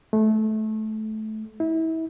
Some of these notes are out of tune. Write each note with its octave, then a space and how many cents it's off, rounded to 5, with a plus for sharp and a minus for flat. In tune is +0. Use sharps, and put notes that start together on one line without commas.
A3 -20
E4 -30